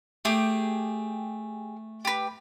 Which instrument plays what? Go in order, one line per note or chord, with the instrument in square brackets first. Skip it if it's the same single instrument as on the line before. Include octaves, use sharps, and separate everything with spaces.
[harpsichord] A3 [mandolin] G4 G#4
[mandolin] G4 B4